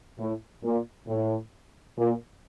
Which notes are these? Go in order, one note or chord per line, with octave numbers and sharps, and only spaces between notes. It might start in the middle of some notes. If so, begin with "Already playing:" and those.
A2
A#2
A2
A#2